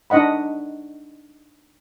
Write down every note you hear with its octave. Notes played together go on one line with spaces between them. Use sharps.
D4 D#4 D#5 F#5 B5